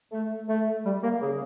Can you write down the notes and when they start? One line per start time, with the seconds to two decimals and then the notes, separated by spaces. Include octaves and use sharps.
0.12 A3
0.49 A3
0.86 G3
1.03 A#3
1.22 C#3